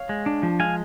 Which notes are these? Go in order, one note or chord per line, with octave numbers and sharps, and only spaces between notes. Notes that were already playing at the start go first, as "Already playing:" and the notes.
Already playing: C#5 F5
G#3
D4
F3
G#3 F5 G#5